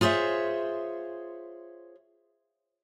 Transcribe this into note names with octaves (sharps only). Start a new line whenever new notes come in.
F4 G#4 C5 C#5 E5